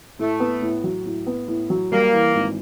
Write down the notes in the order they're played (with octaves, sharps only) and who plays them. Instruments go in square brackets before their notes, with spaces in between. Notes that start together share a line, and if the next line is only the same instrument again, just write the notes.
[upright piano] A2 [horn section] A3
[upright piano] B3
A2
F#3
A2
B3
A2
F#3
[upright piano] G3 [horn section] A#3
[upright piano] E3
G#1